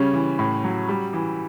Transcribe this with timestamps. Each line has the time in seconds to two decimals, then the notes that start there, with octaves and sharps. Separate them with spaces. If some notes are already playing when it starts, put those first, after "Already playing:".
Already playing: C#3 G3 C#4
0.14 E3
0.39 A2
0.64 F#3
0.89 G3
1.13 E3